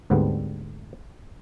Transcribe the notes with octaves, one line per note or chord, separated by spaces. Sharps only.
D2 G#2 D3 G3 B3 C4